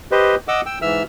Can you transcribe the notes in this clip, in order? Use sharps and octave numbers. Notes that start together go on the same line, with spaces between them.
G4 B4 C5 D#5
D#5 F#5 D6 E6
G5 E6
G#2 E3 E5 E6 F6